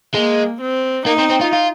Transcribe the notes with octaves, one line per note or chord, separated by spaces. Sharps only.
G#3 A#3
C4
A#3 D#4
C4
C4
F4
F4